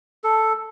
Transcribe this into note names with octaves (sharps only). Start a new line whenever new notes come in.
A4